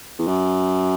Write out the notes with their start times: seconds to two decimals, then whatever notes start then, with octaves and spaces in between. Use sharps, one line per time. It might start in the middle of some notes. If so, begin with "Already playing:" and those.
0.19 E2
0.28 F#2